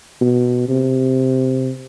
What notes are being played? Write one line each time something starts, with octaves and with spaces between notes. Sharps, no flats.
B2
C3